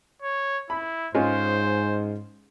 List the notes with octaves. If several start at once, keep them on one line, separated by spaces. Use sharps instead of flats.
C#5
E4 B5
G#2 G#3 C#4 F4 C5